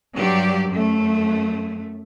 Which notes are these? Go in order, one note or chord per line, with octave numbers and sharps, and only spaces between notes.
G2 F#3 G4 D5
F#2 A3